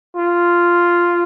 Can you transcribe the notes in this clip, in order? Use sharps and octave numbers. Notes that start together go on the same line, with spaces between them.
F4